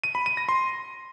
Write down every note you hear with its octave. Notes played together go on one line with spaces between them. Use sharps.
D#7
B5
D#7
A#6
C6